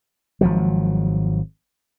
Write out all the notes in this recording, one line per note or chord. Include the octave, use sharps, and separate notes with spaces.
G#1 F3 F#3